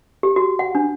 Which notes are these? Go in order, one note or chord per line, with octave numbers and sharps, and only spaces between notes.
G4
F#4
F#5
D4